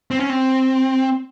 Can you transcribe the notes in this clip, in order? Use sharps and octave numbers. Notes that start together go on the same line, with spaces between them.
C4
C#4
C4